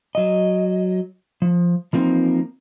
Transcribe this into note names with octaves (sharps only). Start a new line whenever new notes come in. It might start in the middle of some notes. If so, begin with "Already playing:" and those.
F#3 D#5
F3
E3 F3 A#3 C4 D#4